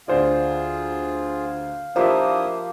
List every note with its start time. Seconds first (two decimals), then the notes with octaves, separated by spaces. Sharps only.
0.08 D2 F4 G#4 C5 D5 F5
1.96 F3 A#3 D4 E4 G4 C5 E5 D#6